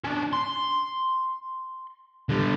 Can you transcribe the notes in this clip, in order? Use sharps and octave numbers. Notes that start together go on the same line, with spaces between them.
C#4 D4
C6
D3 G3